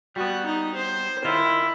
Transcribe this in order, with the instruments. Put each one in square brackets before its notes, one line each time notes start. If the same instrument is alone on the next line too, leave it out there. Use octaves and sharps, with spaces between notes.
[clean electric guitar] G3 B3 [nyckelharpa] F#4
[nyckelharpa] D#4
C5
[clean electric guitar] D#3 F4 [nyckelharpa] E4